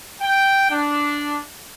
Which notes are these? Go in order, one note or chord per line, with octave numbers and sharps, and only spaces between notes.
G5
D4